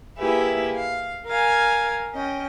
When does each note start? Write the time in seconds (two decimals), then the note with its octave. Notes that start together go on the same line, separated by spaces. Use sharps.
0.18 A#3 E4 G4 G#4 B4 E5
0.74 F5
1.26 A#4 F5 G#5
2.13 C#4 D#5 G5